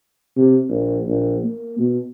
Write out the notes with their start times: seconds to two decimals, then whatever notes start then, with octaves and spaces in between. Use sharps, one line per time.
0.37 C3
0.70 A#1
1.07 A#1
1.43 A#3
1.79 B2